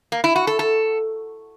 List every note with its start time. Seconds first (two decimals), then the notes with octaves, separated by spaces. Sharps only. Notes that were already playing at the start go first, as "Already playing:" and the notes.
0.12 A#3
0.24 E4
0.36 F#4
0.47 A4
0.59 A4